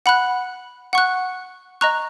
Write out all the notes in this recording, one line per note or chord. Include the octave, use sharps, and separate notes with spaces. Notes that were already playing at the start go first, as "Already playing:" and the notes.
F#5 B5 F#6
F#5 C#6 F#6
D#5 A#5 C#6 F#6